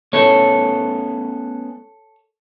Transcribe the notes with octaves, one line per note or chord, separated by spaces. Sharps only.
A3 B3 C#4 A4 C#5